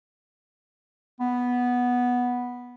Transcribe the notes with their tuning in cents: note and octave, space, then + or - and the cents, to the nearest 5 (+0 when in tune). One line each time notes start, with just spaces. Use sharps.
B3 -5